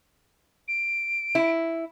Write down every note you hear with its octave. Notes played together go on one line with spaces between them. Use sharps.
D7
E4